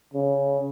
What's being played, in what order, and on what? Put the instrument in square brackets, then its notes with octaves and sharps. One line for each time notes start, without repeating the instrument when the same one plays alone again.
[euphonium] C#3